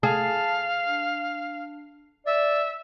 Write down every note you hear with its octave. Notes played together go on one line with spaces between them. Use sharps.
G#4 F5 A5
D4
D5 E5